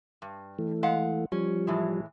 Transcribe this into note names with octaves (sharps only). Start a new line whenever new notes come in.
G2
E3 A3
G#3 F5 F#5
F3 G3 C#4
A2 E3 G#3